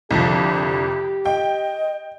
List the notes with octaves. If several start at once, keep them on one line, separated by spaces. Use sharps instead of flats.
C2 F2 D3 F3 G4
D#5 G5